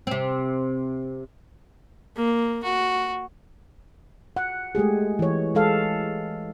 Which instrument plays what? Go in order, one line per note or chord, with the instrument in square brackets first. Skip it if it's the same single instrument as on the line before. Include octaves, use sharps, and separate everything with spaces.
[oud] C3 C4
[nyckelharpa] A#3
F#4
[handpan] F#5
G#3 A3 G4 G#4
E3 C#5
G#3 A4 F5